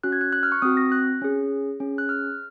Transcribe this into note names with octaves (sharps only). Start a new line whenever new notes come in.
C#4 F#4 F#6
G#6
F#6
F#6
F6
C#6
C4 F#4 D#6
A#6
F#6
C#4 G#4
C#4 G#4
F#6
F6